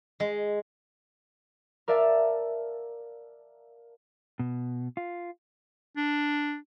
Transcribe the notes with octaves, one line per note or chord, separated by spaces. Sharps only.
G#3
A#4 D5 E5 F5 A5
B2
F4
D4